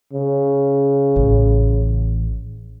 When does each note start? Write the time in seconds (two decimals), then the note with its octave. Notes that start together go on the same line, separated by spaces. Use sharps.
0.13 C#3
1.16 A1